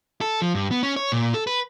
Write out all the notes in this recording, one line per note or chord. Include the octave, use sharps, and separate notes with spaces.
A4
F3
G2
B3
C#4
C#5
A#2
A4
B4